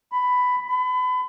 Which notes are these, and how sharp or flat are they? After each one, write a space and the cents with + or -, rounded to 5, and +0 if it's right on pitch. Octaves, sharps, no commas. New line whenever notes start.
B5 +10
B5 +30